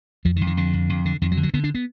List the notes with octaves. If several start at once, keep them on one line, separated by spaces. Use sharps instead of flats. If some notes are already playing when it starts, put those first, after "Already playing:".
F2 F3
D#3
F2
D#3
F2 D3
F2
F2
D3
F2 D#3
F#3
D3
F#3
D3 B3
D4
B3